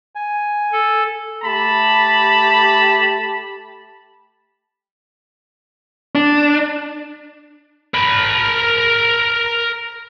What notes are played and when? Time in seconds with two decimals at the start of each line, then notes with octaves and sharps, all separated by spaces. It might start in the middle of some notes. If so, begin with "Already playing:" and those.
0.15 G#5
0.72 A4
1.44 A3 G4 A5 B5
6.15 D4
7.94 A#4 B5